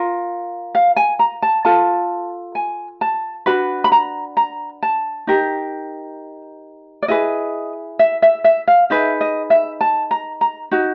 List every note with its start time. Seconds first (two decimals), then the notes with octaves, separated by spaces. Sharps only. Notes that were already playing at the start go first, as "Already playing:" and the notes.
Already playing: F4 A#4
0.75 F5
0.96 G#5
1.19 A#5
1.42 A5
1.65 F4 A4 A5
2.55 G#5
3.01 A5
3.46 D4 F#4 B4 B5
3.84 B5
3.92 A#5
4.37 A#5
4.83 A5
5.27 D#4 G4 A#4
7.03 D5
7.08 E4 G#4 B4 D#5
7.99 E5
8.22 E5
8.44 E5
8.68 F5
8.90 D#4 G#4 B4 E5
9.21 D#5
9.50 E5
9.81 A5
10.11 A#5
10.41 A#5
10.71 D#4 F#4